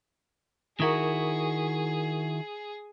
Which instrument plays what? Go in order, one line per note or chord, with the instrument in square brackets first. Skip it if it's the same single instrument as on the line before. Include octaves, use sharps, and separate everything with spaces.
[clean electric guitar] D#3 E4 F#4 [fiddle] G#4 [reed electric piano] A#4 C#6 D#6